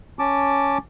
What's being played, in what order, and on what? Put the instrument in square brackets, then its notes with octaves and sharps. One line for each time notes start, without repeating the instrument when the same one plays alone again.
[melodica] C#4 A5 D6